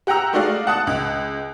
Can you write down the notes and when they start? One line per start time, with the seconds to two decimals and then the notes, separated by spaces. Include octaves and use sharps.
0.07 G4 F#5 G5 A#5 E6
0.33 G#3 A3 D#4 F#4 D5 F5
0.67 F#5 A5 D#6 F#6
0.87 C#2